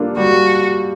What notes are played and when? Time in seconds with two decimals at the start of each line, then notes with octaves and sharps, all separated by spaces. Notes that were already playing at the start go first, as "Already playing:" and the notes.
Already playing: G3 A#3 D4 F4 A4
0.17 G3 F#4